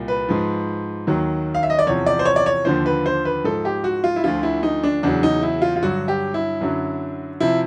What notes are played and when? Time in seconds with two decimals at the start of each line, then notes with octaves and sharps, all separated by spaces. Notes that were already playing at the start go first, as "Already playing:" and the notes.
Already playing: C2 A#2
0.08 B4
0.29 G#2 F3
1.07 D#2 D#3 F#3
1.55 F5
1.63 E5
1.70 D#5
1.79 D5
1.86 E2 C3 F3 C#5
2.06 D5
2.19 C5
2.25 C#5
2.36 D5
2.46 C#5
2.65 D#2 D3 F3 C5
2.86 B4
3.06 C5
3.25 B4
3.44 G#2 F3 A4
3.65 G4
3.84 F#4
4.04 F4
4.16 E4
4.24 D2 D3 F3 F4
4.43 E4
4.63 D#4
4.83 D4
5.03 E2 C#3 F#3 D4
5.23 D#4
5.43 E4
5.62 F4
5.76 F4
5.82 G2 D3 F#3 F#4
6.08 G4
6.34 E4
6.61 F#2 D3 F#3
7.40 C3 F3 E4